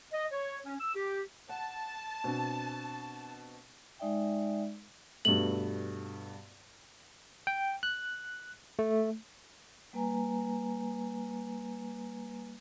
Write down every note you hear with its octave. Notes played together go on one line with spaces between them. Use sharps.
D#5
C#5
C#4
E6
G4
F#5 A5
B2 C4 D4
G#3 D#4 D5 E5 G5
G2 B2 A3 F#7
G5
F#6
A3
G3 A#3 B4 G#5 A#5